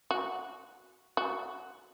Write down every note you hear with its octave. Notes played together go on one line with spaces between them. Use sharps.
F#4
F#4